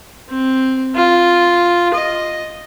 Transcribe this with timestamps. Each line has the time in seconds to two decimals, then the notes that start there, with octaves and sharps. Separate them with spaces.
0.30 C4
0.96 F4
1.94 D#5